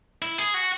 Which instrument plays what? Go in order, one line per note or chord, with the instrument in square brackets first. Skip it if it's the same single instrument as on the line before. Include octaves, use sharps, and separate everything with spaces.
[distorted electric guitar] E4
G#4
F#4